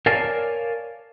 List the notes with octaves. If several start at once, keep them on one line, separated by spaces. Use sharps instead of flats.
A#4 C#5 D5 F5 G#5 A5